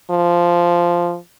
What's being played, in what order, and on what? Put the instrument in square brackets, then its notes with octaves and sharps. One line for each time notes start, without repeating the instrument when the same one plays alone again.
[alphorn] F3